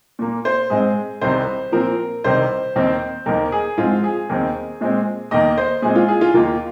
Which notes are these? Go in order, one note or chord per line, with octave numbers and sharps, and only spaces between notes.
A#2 A#3
C5
G#2 G#3 C4 G#4
C2 C3 D#3 C5
A#2 F3 C4 A#4
C2 C3 D#3 C5
D#2 D#3 C4
D#2 D#3 A#3 A#4
G#4
G#2 F3 C4 F4
G#4
D#2 D#3 C4
A#2 G#3 C4
D#2 D#3 A#3 D#5
C5
A#2 G#3 C4 G#4
F4
G#4
F4
D#2 D#3 A#3 F4